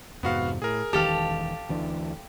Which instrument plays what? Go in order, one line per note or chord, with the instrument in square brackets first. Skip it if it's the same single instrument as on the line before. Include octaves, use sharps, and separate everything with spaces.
[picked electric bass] F2 G#2 C3 [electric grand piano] B3 F#4 F5
[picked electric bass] A2 [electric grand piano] G#4 A#4
[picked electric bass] E1 D#3 E3 [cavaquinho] G4 A4 F5 [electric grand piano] A5
[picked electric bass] D2 E3 D4